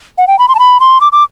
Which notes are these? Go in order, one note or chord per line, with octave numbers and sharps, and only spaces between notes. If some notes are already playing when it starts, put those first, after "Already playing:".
F#5
G5
B5
C6
A5
B5
C6
D6
D6